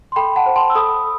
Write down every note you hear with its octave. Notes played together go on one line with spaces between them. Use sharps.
C6
A4 G5 B5
F#5 A5
C5
A5 C6
E6
A4 B5 D#6